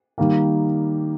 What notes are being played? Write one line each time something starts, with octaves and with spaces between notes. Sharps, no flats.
D#3 G3 A#3